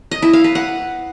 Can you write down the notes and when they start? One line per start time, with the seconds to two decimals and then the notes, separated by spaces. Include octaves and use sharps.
0.11 D#5
0.22 E4
0.33 F5
0.44 B4
0.55 F#5